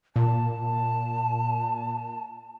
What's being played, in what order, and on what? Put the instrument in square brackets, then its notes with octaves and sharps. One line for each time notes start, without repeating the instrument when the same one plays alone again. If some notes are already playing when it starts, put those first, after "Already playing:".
[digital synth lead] A#2 [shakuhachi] A5